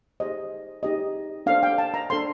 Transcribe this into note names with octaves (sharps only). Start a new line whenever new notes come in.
D#4 G4 C5 D#5
D#4 G4 C5 D#5
D4 A4 C5 F5
G5
A5
A#5
D4 A4 C5 C6